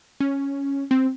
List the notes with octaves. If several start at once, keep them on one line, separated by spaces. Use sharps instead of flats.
C#4
C4